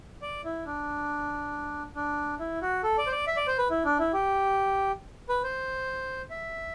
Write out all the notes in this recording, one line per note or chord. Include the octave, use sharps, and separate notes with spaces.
D5
E4
D4
D4
E4
F#4
A4
D5
C5
D5
E5
D5
C5
B4
E4
D4
E4
G4
B4
C5
E5